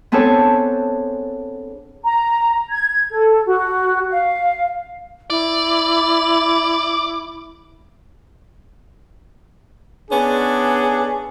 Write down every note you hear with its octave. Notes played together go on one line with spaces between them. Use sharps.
B3 C4 D4 G#4 A4 C#5
A#5
G#6
A4
F#4
F5
E4 D5
B3 C#4 D4 G#4